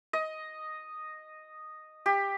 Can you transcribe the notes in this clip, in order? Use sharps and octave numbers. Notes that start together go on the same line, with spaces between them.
D#5
G4